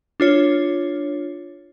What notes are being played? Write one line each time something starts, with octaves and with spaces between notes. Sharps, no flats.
D4 F4 C#5